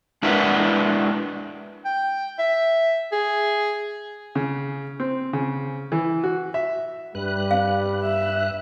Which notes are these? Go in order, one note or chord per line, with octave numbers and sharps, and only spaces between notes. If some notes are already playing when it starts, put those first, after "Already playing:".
G#3 D4 E4 F#4 A#4 B4
G5
E5
G#4
C#3
C4
C#3
E3
F#4
E5
G2 G3 B4 F#6
F5
E5